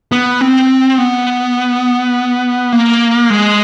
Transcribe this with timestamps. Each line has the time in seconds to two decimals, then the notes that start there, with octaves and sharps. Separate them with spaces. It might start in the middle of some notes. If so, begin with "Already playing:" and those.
0.12 B3
0.41 C4
0.98 B3
2.72 A#3
3.30 G#3